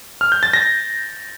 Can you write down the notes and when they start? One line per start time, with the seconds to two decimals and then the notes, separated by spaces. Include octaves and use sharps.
0.21 F6
0.32 G6
0.43 A6
0.53 A#6